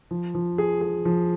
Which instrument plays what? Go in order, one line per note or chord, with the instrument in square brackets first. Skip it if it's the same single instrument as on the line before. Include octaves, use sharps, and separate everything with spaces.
[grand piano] F3
F3
G#4
G#4
F3